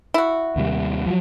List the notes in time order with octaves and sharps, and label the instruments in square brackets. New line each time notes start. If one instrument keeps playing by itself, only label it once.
[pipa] E4 F#4
[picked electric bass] D#2 C3 G3
F3 F#3